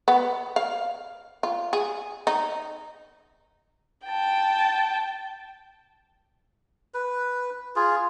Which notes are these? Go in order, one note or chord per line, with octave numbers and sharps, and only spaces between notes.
B3
F5
F4
G#4
D#4
G5 A5
B4
F4 G#4